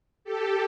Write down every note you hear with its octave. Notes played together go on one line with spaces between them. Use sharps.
G4 A4